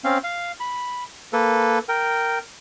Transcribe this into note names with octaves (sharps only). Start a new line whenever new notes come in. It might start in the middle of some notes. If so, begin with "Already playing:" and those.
C4 C#4 F5
F5
B5
A#3 A4 B4
A#4 G5